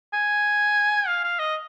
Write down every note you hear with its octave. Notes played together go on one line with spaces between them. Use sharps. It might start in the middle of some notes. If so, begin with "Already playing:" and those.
G#5
F5
F5
D#5